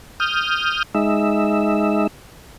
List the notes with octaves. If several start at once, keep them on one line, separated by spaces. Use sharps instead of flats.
D#6 F6 G6
G#3 D#4 E5